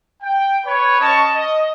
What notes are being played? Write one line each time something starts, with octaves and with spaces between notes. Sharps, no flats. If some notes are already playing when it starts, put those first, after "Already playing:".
G5
B4 C#5
C#4 D#5 A5 C#6
D#5